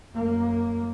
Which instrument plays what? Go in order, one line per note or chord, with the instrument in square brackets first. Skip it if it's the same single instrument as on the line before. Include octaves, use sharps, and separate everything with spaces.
[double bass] F#2 A#3